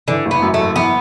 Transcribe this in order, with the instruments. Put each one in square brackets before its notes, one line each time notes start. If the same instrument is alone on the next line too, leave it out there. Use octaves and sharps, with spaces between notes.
[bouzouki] D3 [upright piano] E3
[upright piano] F#1
[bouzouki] B3
[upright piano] F#2
[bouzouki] A3
[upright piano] F#1
[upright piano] E3 [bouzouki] B3